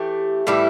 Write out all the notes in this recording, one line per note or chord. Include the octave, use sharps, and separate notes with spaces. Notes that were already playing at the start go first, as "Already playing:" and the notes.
Already playing: E3 A3 G4
A2 E3 G3 E4